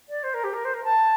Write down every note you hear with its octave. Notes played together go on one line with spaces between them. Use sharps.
D5
C5
A#4
G4
A#4
C5
A#4
A5